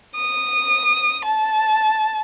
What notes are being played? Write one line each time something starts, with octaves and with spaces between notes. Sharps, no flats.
D#6
A5